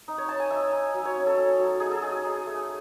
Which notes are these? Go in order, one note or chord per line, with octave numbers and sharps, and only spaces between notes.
D#4
C#5
D#4 A5
G#5
D#4 E5
D#4
F#3
C#5
C#4
A4
C#4
F#3
D#4 G#4
A4
D#4 G#4
D#4
A3